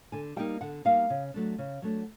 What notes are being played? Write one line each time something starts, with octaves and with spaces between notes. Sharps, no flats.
D3 G#5
G3 A#3 D#4 G5
D3 F#5
G3 A#3 D#4 F5
C#3
F#3 A3 D4
C#3
F#3 A3 D4